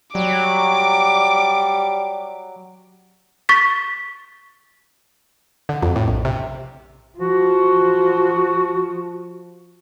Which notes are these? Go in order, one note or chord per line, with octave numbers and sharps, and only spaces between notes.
F#3 G3 D6
C#6 A6 B6
D3
F2
A2
A#1
C3
F3 F#4